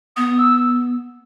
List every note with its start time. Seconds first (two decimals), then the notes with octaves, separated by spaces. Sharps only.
0.16 B3 D#6
0.39 E6